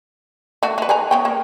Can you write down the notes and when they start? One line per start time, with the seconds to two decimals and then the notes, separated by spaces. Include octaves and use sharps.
0.63 A3 D4 F#4
0.78 D#4 B4
0.89 B4 G#5 A#5
1.11 B3 C#4 G5
1.25 A#3